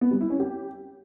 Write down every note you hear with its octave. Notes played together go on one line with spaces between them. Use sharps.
B3
G3
E4
C#4
G4